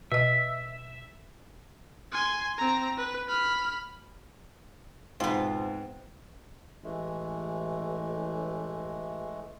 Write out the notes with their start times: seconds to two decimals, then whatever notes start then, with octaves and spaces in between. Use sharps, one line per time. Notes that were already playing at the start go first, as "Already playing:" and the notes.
0.12 B2 B4 D#5 E5
2.12 G#5 C6
2.58 C4 A#5
2.97 B4
3.28 B5 F6
5.20 G#2 B2 B3 C4 F4
6.84 A1 E3 G#3 A3